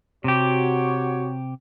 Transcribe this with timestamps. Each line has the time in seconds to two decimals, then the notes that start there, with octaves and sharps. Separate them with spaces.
0.24 C3 F#4 G4 C#5